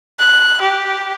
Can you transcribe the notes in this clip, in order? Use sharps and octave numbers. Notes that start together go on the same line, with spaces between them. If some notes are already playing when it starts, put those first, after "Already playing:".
F#6
G4